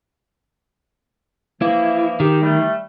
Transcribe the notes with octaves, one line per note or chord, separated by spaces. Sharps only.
E3 F3 A#3 E4
D#3 G4
G3 A3